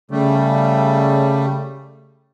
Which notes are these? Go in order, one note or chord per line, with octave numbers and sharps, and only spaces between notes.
C#3 G3 A3